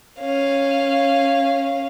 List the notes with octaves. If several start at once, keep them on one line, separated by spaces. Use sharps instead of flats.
C#4 F5